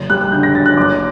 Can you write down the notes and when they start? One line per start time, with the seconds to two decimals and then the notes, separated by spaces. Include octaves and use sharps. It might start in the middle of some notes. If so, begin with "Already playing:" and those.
Already playing: F#1
0.10 G3 F#6
0.21 F#6
0.32 D3 G6
0.43 A#6
0.55 F#2 A6
0.66 F#6
0.77 F#1 D6